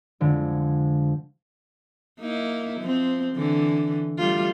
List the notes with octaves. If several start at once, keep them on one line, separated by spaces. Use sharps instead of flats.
F2 D3 G#3
A#3 D#4 E4
F3 C4
D3 E3
G3 A3 F4